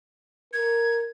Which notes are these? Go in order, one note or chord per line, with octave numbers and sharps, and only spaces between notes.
A#4 G#6